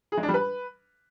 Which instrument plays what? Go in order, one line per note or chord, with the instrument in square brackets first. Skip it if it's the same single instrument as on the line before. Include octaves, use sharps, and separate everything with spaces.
[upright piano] G#4
G#3
D4
G3
B4